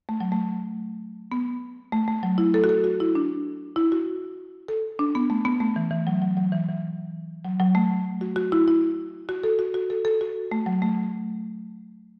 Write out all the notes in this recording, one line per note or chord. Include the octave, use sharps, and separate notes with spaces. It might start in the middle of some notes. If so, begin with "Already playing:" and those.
A3
F#3
A3
B3
A3
A3
F#3
E4
A4
F#4
A4
F#4
E4
D4
E4
F#4
A4
D4
B3
A3
B3
A3
E3
E3
F#3
F#3
F#3
E3
E3
F#3
F#3
A3
F#4
F#4
E4
E4
F#4
A4
F#4
F#4
A4
A4
F#4
A3
F#3
A3